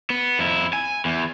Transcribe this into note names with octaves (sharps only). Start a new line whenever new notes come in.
B3
F2 E4
G#5
E2